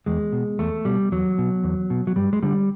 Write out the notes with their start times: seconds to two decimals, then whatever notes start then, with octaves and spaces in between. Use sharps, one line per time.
0.06 E2 G#3
0.32 B2
0.59 E2 A3
0.85 B2 G3
1.12 E2 F#3
1.38 B2
1.64 E2
1.90 B2
2.07 F#3
2.16 G2 G3
2.33 G#3
2.43 D3 G3